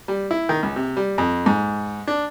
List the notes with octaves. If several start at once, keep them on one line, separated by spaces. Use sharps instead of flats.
G3
E4
D#3
C#2
C3
G3
F2
G#2
D4